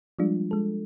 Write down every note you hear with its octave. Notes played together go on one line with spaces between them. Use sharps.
F3 G3 G#3 D4 F4
G#3 A4